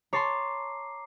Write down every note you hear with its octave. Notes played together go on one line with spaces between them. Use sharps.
C#5 A5 A#5 C6 D6 C7